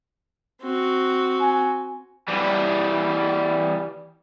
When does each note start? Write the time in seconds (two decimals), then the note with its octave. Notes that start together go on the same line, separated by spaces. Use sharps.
0.63 C4 F#4
1.41 G#5
2.28 E3 G3